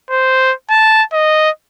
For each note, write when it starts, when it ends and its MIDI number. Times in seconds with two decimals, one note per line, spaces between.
0.10 0.53 72
0.70 1.03 81
1.13 1.50 75